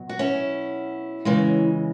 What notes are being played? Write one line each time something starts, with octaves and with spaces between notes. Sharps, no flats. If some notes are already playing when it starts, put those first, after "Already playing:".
Already playing: B2 F#3
F#4
C#4 E4
C#3 E3 G#3